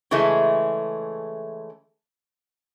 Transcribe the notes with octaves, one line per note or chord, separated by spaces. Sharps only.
C#3 E3 G#3 A3